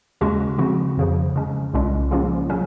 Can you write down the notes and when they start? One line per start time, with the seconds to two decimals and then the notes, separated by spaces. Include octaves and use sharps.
0.21 D#2 C#3 G#3 C#4 F#4
0.58 C#3 F3 C4 F#4
0.97 F2 C#3 F3
1.36 C#3 G#3 C#4
1.74 C2 A#2 G#3 C#4 F4
2.11 C#3 F3 A#3 C#4 F4
2.50 C#3 F#3 C#4